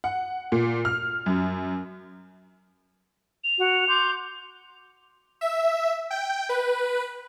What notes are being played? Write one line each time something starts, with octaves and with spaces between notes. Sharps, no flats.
F#5
A#2
F6
F#2
F7
F#4
C6 D6 G6
E5
G5
B4